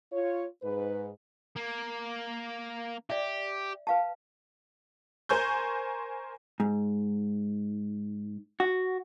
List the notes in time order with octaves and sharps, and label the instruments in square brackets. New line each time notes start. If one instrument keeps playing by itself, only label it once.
[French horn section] F4 C#5
G#2 B4
[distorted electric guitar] A#3
[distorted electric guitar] G4 [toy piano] D5 E5
[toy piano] B4 F5 A5
[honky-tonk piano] A#4 C5 G#5 C#6 G6
[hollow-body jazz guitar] G#2
F#4